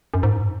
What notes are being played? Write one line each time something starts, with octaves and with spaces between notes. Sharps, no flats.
F#2
G#2